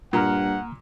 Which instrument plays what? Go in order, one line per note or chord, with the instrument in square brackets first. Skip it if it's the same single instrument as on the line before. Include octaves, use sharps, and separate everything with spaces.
[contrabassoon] G2 [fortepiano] A#2 [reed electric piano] A#3 A#5 F6 [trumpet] F#5